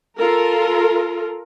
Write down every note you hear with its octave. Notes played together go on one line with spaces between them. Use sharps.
F4 A4 A#4